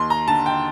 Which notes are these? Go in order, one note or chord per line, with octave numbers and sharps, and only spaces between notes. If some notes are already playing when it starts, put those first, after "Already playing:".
Already playing: D#2 C6
A#5
D3 A5
G5